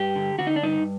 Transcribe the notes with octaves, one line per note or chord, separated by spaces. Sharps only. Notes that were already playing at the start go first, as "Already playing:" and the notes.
Already playing: G2 G4
D3
D3 F#4
D#4
D4
G2 D#4